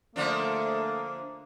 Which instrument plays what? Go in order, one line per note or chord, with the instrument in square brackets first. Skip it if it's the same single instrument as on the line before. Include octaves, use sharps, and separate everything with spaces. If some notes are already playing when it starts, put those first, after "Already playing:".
[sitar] D3 F3 D4 [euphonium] A3 [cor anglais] A#3